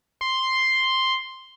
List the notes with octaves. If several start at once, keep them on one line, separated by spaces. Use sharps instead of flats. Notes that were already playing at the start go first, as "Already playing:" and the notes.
C6